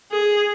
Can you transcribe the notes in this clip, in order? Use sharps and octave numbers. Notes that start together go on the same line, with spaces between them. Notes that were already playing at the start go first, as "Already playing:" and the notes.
G#4